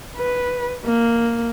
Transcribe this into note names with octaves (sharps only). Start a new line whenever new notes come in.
B4
A#3